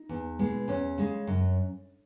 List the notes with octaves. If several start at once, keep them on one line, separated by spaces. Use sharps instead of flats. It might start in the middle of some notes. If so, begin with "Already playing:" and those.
Already playing: D#4
E2
B2 G#3 B3
E2 C#4
C#3 G#3
F#2